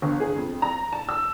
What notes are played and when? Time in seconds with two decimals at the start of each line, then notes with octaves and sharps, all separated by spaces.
0.02 G1
0.20 G#4
0.36 F2
0.62 A#5
0.93 A5
1.09 E6